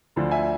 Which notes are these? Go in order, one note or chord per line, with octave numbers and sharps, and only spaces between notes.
D2 D3 F3
E5 G#5